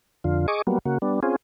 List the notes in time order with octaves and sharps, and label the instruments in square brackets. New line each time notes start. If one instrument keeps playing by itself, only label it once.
[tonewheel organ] F2 D3 F4
G#4 D#5 C#6 D6
F#3 G3 A#3 B3
C#3 A#3 F#4
G3 B3 D4
C4 C#4 F4 G#4